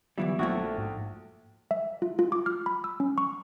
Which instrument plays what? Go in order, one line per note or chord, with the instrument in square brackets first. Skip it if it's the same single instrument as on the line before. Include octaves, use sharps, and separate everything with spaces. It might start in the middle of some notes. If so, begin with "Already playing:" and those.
[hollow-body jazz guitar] D2 E3 G3 [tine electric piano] F#3 B3 F4 [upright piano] E5
[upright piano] A#1 A4 [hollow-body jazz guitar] A3 E4 F#4
[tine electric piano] G#2
[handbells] E5
F4
F4
D6
F6
B5
E6
C#4
C#6